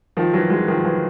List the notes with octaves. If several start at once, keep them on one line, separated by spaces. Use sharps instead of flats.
D#3 F3
E3 F#3
F#3 G#3
D#3 F3
E3 F#3